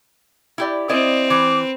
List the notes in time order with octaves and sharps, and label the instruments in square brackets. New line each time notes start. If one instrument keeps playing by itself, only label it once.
[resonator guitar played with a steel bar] E4 G4 D5
[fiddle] C4 [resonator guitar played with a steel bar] E4 D5 D#5
[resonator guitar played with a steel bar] E3 [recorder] D6